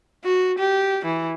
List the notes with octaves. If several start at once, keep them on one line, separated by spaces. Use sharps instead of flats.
F#4
G4
E3